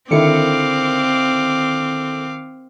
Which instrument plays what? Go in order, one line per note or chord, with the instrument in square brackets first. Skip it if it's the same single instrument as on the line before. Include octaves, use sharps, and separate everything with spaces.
[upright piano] D3 E4 [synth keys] D#3 C#7 [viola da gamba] C4 [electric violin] F5 D6